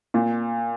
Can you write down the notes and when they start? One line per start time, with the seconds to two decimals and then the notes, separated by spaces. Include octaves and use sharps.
0.14 A#2